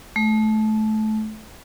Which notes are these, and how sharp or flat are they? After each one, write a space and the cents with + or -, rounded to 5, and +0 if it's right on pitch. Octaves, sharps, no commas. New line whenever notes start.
A3 -25